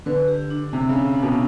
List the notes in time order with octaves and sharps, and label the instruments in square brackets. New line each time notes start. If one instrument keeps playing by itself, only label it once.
[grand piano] D3 [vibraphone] B4
[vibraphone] G4
D4
[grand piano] C3 [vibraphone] D4
[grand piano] C#3
[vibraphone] D4
D4
[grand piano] B2